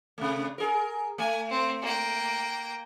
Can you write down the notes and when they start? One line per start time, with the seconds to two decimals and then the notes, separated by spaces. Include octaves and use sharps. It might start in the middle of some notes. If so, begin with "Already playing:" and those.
0.18 C3 A3
0.58 G#4 A#4
1.18 A3 G#5
1.50 C4
1.82 A#3 G5